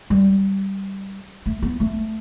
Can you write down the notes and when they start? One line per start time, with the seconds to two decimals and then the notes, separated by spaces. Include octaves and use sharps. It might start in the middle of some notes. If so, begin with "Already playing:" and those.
0.10 G3
1.46 A3
1.62 B3
1.80 A3